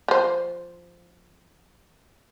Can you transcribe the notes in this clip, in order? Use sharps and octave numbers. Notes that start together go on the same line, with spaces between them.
F3 C5